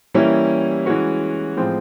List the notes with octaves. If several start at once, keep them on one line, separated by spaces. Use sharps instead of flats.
E3 G3 A#3 C#4 E4
E3 G#3 C#4 F#4
A2 F3 G#3 C4 F4